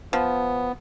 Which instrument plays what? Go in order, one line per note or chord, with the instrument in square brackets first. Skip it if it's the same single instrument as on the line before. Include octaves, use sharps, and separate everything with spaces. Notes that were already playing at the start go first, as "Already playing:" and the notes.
[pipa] F3 [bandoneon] B3